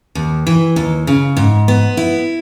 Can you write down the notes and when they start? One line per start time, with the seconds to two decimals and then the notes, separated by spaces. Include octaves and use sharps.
0.15 D#2
0.47 E3
0.76 D#2
1.07 C#3
1.37 G#2
1.68 B3
1.97 E4